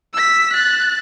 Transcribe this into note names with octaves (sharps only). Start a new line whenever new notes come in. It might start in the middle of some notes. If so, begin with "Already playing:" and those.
E6 B6
F#6 A6